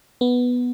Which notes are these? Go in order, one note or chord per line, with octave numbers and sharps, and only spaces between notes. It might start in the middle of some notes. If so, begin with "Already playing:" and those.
B3